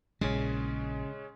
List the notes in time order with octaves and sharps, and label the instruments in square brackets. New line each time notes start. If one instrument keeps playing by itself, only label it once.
[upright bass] A#1 E4 [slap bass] C#3 [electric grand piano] G#3 C#4